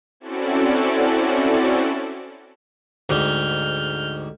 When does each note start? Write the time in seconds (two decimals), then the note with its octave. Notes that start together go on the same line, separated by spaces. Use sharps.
0.20 C4 C#4 E4 F#4 A4 D5
3.09 D2 G#2 G3 F6 G6